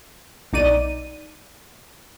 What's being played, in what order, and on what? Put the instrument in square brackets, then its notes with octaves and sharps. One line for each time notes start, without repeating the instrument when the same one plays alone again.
[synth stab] B1 D#4 D5 D#7